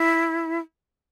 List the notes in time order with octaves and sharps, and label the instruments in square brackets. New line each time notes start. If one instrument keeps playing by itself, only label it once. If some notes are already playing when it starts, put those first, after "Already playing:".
Already playing: [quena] E4